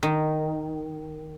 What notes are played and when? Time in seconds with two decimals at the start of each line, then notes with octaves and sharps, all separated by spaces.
0.03 D#3